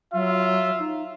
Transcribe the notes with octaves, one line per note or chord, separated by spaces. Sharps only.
F#3 F4 E5
D#4